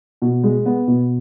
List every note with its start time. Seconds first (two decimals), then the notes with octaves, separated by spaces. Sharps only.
0.22 B2
0.43 G#3
0.65 B3
0.88 B2